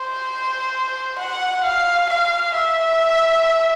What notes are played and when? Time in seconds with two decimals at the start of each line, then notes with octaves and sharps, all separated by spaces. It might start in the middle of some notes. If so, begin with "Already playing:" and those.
Already playing: C5
1.18 F#5
1.63 F5
2.09 F5
2.55 E5